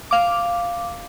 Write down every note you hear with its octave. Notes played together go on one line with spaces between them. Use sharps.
F5 D6